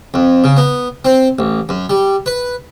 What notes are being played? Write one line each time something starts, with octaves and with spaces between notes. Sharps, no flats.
F2
C#3
B3
C4
A1
F#2
G3
B4